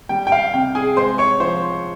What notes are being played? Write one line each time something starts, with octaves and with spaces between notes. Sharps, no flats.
G3 G5
G5
F5
C3 G5
G#4 G#5
G#3 C5 C6
C#5 C#6
F3 C5 C6